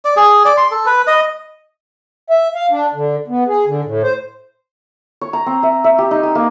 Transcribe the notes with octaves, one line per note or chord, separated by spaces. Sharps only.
D5
G#4
D5
C6
A4
B4
D#5
E5
F5
D4
D3
B3
G#4
D3
A2
C5
C#5
A#5
C4
E5
E5
G4
D#4
G#5
A#3